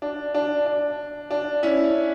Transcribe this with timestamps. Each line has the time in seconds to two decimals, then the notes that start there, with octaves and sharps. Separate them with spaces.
0.02 D4
0.34 D4
0.66 D4
1.31 D4
1.63 C#4 E4